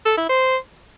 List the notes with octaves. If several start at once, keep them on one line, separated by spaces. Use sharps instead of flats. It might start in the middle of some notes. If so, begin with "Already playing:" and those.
A4
E4
C5